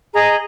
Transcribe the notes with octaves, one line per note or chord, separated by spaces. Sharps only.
G#4 D#5 A#5